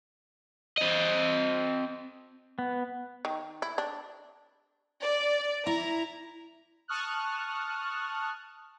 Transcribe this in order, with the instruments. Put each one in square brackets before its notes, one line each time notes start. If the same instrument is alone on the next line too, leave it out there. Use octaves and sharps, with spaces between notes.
[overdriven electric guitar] C4 D#5
[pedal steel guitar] B3
[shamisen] D#3
E4
D4
[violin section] D5
[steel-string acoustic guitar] E4 [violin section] A#5
[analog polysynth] A5 C#6 D#6 F6 F#6